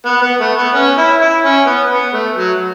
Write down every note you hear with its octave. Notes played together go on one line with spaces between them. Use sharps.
B3
B3
A3
B3
C#4
E4
E4
C#4
B3
B3
A3
F#3